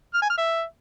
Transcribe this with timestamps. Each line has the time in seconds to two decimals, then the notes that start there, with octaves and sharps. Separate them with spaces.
0.14 F6
0.22 G#5
0.30 F6
0.37 E5